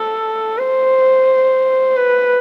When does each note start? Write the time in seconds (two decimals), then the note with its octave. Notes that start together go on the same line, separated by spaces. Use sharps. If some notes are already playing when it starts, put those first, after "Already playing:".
Already playing: A4
0.58 C5
1.97 B4